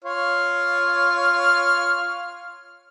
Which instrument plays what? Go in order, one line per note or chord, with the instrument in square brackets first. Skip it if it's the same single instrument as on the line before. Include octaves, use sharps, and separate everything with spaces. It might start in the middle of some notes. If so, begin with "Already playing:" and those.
[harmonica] F4 C#5 F6